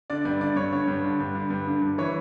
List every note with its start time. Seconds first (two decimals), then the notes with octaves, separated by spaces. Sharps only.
0.10 D3 D5
0.25 G2 D5
0.41 D3 D5
0.56 G2 C#5
0.72 D3 C#5
0.88 G2
1.04 D3
1.20 G2
1.35 D3
1.50 G2
1.67 D3
1.82 G2
1.98 E3 C#5